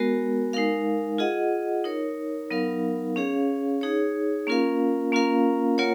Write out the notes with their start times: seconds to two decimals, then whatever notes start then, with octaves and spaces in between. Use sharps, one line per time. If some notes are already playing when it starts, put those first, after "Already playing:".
Already playing: G#3 B3 F#4 A#4
0.53 G#3 D#4 A#4 F5
1.18 F4 G#4 D#5 F#5
1.84 D#4 A#4 C#5
2.50 F#3 B3 D#4 A#4 F5
3.16 C#4 G#4 C#5 F5
3.81 D#4 G#4 C#5
4.47 A#3 C#4 F4 A#4 F5
5.12 A#3 C#4 F4 A#4 F5
5.78 A#3 F4 A#4 C#5 F#5